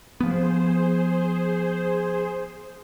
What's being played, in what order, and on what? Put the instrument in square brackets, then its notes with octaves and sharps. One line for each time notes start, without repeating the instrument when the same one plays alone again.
[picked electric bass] F3 B3 [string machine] G#4 C5